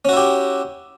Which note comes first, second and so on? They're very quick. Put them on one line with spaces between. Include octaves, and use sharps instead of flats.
C#4 F#4 E4 G4